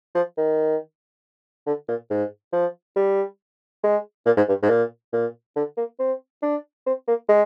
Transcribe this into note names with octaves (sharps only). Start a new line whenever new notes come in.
F3
D#3
D3
A#2
G#2
F3
G3
G#3
A#2
G#2
G2
G#2
A#2
A#2
D3
A#3
C4
D4
C4
A#3
G#3